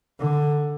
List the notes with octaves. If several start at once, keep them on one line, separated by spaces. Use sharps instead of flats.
D3